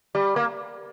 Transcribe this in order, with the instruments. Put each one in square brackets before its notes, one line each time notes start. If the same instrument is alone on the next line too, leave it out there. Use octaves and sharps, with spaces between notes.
[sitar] G3
A#3